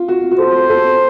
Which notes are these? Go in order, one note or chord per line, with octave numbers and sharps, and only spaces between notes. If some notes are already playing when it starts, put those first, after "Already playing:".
Already playing: F4
F#4
F#4
A4 C5
A4